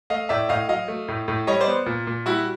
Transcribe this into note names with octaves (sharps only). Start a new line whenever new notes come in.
A3 D#5 F5
A2 D5 E5
A2 D#5 F5
F#3 D#5 F5
A3
A2
A2
G3 C#5 D#5
C5 D5
B3
A#2
A#2
G3 E4 F#4